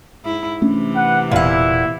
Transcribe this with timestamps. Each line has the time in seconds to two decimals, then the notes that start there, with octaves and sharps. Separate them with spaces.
0.24 G#2 E4
0.62 C3 E3 A3 C#4 D4
0.94 B4 F#5
1.31 E1 A#2 E4 F#5